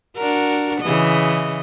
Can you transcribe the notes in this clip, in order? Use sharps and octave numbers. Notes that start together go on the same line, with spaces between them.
D4 F#4 A#4
C#3 E3 D#5